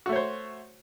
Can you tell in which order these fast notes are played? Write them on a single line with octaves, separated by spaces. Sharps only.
F#4 A3 C#5 C5